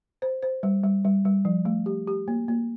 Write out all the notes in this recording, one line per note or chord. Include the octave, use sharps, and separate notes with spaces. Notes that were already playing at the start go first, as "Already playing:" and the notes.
C5
C5
G3
G3
G3
G3
F3
A3
G4
G4
A#3
A#3